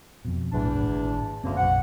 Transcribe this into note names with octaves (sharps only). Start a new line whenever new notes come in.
F2 B2
B1 E2 A2 D4
G#1 A2
G1 D2 C#3 A#3 C4
F#1 B1 F#5